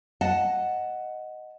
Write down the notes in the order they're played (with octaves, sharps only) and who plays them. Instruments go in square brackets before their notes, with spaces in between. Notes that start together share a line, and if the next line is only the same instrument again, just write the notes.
[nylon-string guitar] D#5 F#5 A5